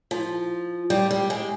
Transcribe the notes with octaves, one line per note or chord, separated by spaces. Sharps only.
F3
G3
G3
G#3